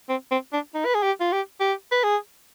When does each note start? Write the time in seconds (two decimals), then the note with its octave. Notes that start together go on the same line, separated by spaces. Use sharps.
0.09 C4
0.31 C4
0.53 D4
0.74 D#4
0.85 B4
0.94 G#4
1.03 G4
1.20 F4
1.32 G4
1.60 G4
1.92 B4
2.03 G#4